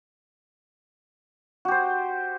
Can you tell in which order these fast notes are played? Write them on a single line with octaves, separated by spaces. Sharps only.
F#4 G4 C5